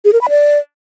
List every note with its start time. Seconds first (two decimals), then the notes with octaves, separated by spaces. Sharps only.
0.05 G#4
0.13 A#4
0.21 B5
0.29 D5